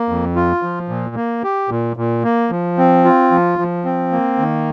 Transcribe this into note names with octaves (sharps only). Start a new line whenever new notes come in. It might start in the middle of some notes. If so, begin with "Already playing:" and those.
Already playing: A#3
F2
F4
F3
A#2
A#3
G4
A#2
A#2
A#3
F3
C4
F4
F3
F3
C4
A#3
D#3